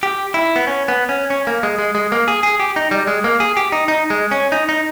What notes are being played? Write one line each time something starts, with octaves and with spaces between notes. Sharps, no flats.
G4
E4
B3
C#4
B3
C#4
C#4
A#3
G#3
G#3
G#3
A#3
G#4
G#4
G4
D#4
G3
G#3
A#3
G#4
G4
D#4
D#4
G#3
C#4
D#4
D#4